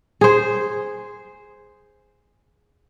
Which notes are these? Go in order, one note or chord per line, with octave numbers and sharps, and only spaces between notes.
G#4 C5